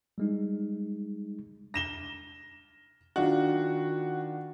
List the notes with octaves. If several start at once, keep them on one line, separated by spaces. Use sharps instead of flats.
G3 G#3 D#4
A#6 E7 G7
D#3 D4 F4 F#4